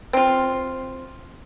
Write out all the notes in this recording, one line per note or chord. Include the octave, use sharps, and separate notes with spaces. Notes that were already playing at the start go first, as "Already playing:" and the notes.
C4 F4